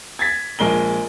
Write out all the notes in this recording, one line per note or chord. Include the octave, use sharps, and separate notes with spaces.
G#6 A6 B6
A#1 G#3 A#4 G7